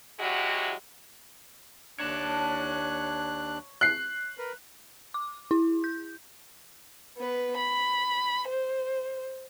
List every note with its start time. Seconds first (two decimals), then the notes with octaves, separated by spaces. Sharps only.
0.20 F#3 G#3 E4 F#4 G4
2.00 D#2 D4 C#5 A5 F#6
3.81 F#6 C7
4.38 A#4 B4
5.14 D6
5.51 E4
5.84 G6
7.18 B3 B4
7.57 B5
8.48 C5